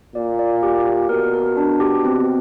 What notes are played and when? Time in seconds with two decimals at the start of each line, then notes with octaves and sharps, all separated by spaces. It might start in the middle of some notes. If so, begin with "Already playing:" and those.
0.15 A#2 D5
0.39 D5
0.63 G4
0.86 G4
1.09 B2 A#4
1.33 A#4
1.57 D4
1.80 G4
2.05 C4